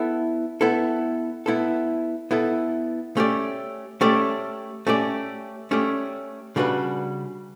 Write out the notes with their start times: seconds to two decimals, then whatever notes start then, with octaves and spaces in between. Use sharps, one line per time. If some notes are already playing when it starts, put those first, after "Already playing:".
Already playing: B3 E4 A4
0.61 B3 E4 A4
1.46 B3 E4 A4
2.31 B3 E4 A4
3.17 A3 C#4 G4 D5
4.01 A3 C#4 G4 D5
4.87 A3 C#4 G4 D5
5.71 A3 C#4 G4 D5
6.56 C#3 G3 D4 F#4 B4